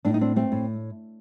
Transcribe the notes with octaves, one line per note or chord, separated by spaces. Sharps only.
A2 D4
D#4
C4 D4
A3 C4
A2